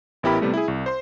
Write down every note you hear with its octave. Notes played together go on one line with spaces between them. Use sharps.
A1 B3 E4 G4 A#4 B5
C3 G3 A3 B3
E4 G#4
C2
C5 C6